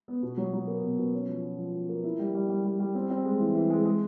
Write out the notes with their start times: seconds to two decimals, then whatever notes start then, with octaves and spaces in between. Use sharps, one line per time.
0.08 B3
0.23 B2
0.37 F#3
0.53 F#3
0.67 A#3
0.83 B2
0.98 B2
1.14 C#4
1.28 F3
1.43 F3
1.58 F3
1.73 F3
1.89 A#3
2.04 E4
2.19 G3
2.34 G3
2.49 G3
2.64 G3
2.80 G3
2.95 C4
3.10 C4
3.25 G#3
3.40 E3
3.55 E3
3.70 G#3
3.85 G#3